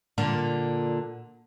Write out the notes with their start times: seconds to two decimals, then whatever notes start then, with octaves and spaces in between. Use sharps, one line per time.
0.18 A#2 D3